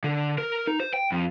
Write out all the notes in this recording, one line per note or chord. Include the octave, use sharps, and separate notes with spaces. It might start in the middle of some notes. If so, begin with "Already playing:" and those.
D3
A#4
D#4
C5
G5
F2